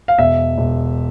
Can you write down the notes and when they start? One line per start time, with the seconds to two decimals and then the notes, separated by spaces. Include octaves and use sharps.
0.08 F5
0.18 E1 E5
0.58 E1